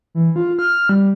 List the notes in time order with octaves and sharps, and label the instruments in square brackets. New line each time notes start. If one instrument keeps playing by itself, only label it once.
[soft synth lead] E3
F4
F6
G3